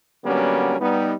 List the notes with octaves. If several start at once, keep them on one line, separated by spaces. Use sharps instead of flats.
D3 F#3 G3 A#3 B3 C#4
G3 B3 D#4